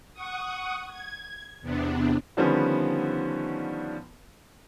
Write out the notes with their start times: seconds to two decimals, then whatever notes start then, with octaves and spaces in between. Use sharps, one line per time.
0.13 F#5 C#6 D#6
0.88 G#6
1.61 E2 C3 B3 D4
2.37 D3 D#3 F3 G3 B3 C#4